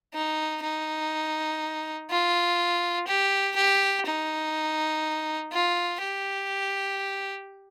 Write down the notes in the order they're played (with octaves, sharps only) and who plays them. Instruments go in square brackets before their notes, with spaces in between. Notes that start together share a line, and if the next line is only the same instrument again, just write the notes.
[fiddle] D#4
D#4
F4
G4
G4
D#4
F4
G4